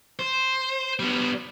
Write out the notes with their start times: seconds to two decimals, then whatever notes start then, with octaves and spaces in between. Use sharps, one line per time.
0.19 C5
0.99 G3 B3